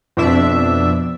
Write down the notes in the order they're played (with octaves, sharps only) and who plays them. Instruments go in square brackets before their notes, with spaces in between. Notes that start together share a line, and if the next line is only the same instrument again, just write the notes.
[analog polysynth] F2 B2 D4 E5